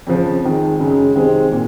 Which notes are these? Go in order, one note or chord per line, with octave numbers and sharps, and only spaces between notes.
F2 C#3 F3
F2 D#3 G#3
F#2 C#3 G#3
C3 D#3 G#3 C4
A#2